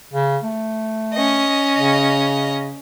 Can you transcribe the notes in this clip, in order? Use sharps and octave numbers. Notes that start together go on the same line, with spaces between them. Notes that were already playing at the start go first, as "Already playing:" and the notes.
C#3
A3
C#4 D#5
C#3